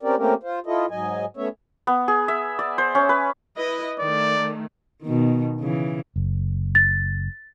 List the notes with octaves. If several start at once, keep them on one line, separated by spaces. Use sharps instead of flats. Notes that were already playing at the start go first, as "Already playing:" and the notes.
C4 C#4 G4 A#4 D5
A3 A#3 C4 C#4 G4 A#4
F4 C5
E4 F4 A4 D#5
G#2 F#3 D#5 G#5
A3 B3 C#4 C#5 E5
B3
G#4
E5
D5
C5
C#4
B4
E4 B4 D#5
D#3 A3 D5
B2 D#3
C#3 E3
F#1
A6